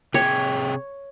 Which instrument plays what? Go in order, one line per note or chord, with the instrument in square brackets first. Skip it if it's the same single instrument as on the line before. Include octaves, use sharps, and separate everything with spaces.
[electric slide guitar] C3 G#4 G5 [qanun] C#5